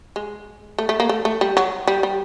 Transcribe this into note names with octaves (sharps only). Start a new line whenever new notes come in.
G#3
A3
A3
A#3
A3
A3
G3
F#3
G3
G3